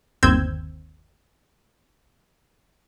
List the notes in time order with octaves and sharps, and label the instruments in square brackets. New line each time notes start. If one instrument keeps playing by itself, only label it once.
[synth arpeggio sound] G1 D#2 C4 E6 G6 G#6